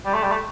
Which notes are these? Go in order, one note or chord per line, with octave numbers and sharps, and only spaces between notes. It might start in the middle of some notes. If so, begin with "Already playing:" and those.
G3
A3
G3
A3